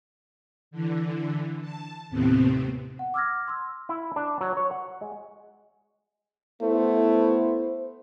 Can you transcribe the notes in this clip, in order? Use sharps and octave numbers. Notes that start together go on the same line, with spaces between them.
D3 E3
A5
D#2 A2 C3 B3 C4
F#5
D6 E6 F6 G#6 A#6
C6 E6
E4
D4
F#3
C#5
F#5
G#3
A3 B3 E4 C5